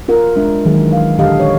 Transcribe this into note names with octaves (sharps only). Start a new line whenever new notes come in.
F4 A#4 F#5
G#3 D4 E5
D#3 E3 F#3 G#3 G#4
F5
A#2 D3 G4 A4 D#5 F5
C#5 D#5